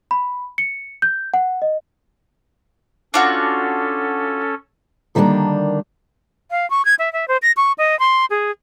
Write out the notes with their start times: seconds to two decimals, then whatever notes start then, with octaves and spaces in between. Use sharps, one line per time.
0.11 B5
0.58 C#7
1.02 G6
1.34 F#5
1.62 D#5
3.14 C#4 D4 F4 F#4 A4
5.15 D3 D#3 G3 A#3 D4
6.51 F5
6.70 C#6
6.85 G#6
6.99 E5
7.13 E5
7.28 C5
7.42 A#6
7.57 C#6
7.78 D#5
7.99 C6
8.30 G#4